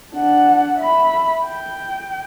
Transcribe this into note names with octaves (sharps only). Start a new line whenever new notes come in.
D4 F#5
E5 B5
G5